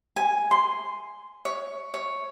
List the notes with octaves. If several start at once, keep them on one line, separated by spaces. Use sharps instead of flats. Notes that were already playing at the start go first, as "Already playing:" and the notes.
G#5
C6
C#5
C#5